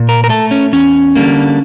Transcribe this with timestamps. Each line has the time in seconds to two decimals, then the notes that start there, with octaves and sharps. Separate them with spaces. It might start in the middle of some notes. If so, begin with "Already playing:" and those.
Already playing: A#2
0.09 A#4
0.24 A#4
0.30 A3 A4
0.51 C#4
0.73 E2 C#4
1.16 D3 G3 A#3